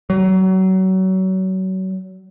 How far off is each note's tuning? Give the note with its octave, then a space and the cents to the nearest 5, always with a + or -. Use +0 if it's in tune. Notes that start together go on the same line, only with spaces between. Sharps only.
F#3 +30